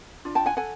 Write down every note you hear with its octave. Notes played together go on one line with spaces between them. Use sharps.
D4 F4
G5 A5
F#5 G#5
A4 F#5 G#5